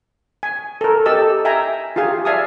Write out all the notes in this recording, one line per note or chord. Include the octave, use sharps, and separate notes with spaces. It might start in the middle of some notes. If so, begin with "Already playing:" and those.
G#5
A4 A#4
G4 A4 D#5 A5 E6
E5 G5 G#5 A#5
F4 G4 G#4 F5 G#5
D5 E5 F5 G#5 A5 D#6